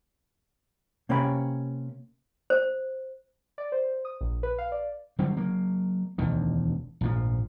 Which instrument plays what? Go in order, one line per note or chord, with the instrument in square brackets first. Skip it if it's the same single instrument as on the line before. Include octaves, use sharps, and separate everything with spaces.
[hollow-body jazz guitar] C3 A#3 C#4 C#5 G5 B5
[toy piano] C5
[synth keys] D5
C5
D#6
A#1
B4
F5
D5
[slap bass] D3 F#3 G3 C4
F#3 A#3
E1 D2 D#3
A#1 G#2 F3